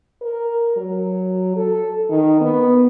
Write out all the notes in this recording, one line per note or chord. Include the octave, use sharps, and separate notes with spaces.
A#4
F#3
A4
D#3
B3